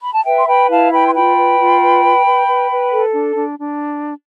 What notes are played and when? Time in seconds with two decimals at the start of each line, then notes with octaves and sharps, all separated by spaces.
0.02 B5
0.13 A5
0.25 B4 E5 G5
0.38 C6
0.47 B4 G5 B5
0.70 E4 F5 A5
0.92 B4 G5 B5
1.08 C6
1.14 F4 G5 B5
1.36 B4
1.59 F4
1.81 B4
2.04 B4
2.25 B4
2.48 B4
2.70 B4
2.92 A4
3.14 D4
3.36 D4
3.59 D4